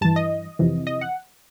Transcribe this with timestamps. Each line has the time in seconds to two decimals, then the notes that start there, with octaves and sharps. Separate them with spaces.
0.01 G2 E3 A5
0.16 D#5
0.59 F2 C3 E3
0.87 D#5
1.01 F#5